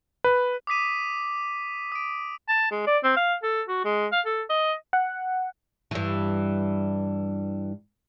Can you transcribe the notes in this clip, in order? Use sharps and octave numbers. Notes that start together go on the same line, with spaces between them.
B4
D6 D#6 B6 D#7
D#6 D7
A5
G#3
D5
C4
F5
A4
F#4
G#3
F5
A4
D#5
F#5
G2 E3